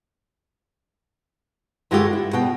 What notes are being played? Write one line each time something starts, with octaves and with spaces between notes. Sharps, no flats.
G2 D3 G#3 A3 F4 G4
E4
B2 B3 G5